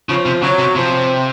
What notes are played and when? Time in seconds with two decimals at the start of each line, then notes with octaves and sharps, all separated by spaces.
0.09 C#3 F3
0.26 C3
0.42 C#3 F#3
0.59 C3
0.76 C3 F3